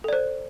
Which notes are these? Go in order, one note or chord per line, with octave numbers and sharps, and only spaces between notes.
A4 C5 D5